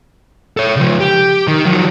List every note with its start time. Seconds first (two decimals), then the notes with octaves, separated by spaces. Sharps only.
0.57 A4 C#5
0.76 C#3 F3
1.00 G4
1.48 D#3
1.65 F3 F#3